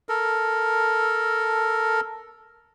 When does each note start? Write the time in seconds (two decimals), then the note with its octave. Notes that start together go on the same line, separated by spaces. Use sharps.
0.09 A4 A#4